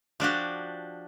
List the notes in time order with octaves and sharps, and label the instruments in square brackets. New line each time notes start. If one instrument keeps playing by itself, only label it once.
[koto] F3 D4 F#4 G4